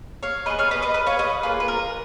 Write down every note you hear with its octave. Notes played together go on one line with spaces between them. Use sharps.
C#5 F5
B3 F4 G#4 B4 D#5
C#5 F5
B4 D#5
B4 D#5
B4 D#5
C#5 F5
B4 D#5
A#3 F4 G#4 B4
B4
A#4